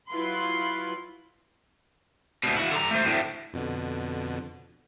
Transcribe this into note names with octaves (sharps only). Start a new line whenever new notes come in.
F#3 E4 F4 B4 B5 C6
D2 B2
E4 F#4
D3 A#5
A3 C5
D2 A2
F2 B2 D3